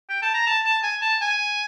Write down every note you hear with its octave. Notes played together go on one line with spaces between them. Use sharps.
G5
A5
A#5
A5
A5
G#5
A5
G#5